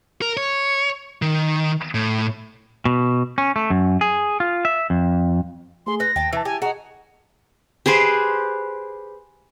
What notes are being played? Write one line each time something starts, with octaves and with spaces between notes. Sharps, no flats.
A#4
C#5
D#3
A2
B2
C#4
A3
F#2
G#4
F4
E5
F2
A3 G#4 C6
B4 A#6
D#2 G5 A5
E3 E4 A5
G4 G#5
F#4 G#4 D#5 A#5
G4 G#4 B4 C5